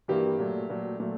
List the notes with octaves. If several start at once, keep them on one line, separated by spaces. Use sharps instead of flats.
G2 E3 G3 A#3 G4
A#2 F#3 A3
A#2 F#3 A3
A#2 F#3 A3